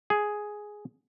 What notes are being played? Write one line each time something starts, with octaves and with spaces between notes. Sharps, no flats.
G#4